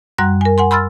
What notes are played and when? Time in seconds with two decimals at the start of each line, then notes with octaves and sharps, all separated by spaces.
0.18 F#2 G3 F#5 C6 F#6
0.41 A#4 G#5
0.58 F#5 G#5 C6
0.71 B5 C6 E6 F6 A6